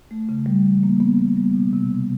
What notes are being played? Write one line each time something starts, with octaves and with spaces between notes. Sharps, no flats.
A3
C#3
G3
E3
A#3
B3
B3
G3
B2
C3
C3